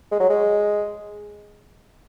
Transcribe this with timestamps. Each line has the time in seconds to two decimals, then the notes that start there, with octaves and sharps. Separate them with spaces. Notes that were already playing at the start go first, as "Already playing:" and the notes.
0.11 G#3
0.20 F#3
0.29 G#3